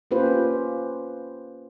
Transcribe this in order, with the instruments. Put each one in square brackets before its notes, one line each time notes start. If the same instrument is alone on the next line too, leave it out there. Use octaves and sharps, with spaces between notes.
[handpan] A#3 C#4 F4 G4 B4 C5